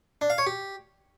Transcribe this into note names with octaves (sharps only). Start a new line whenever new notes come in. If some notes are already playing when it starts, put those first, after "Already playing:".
D4
F5
C#5
G4